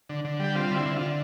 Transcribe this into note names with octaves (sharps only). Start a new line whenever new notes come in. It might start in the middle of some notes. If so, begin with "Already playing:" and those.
D3
D3
G3 G4
C4 F4
D3 E4
D3
D3 F4